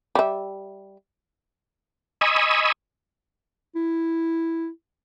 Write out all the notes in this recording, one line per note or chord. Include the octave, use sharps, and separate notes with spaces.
G3 E5
D#5 G#5 B5 C#6 D#6 E6
E4